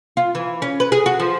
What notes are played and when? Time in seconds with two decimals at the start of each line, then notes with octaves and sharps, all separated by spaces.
0.17 F4
0.35 E3
0.62 C#4
0.80 B4
0.92 G#4
1.06 F#4
1.20 F3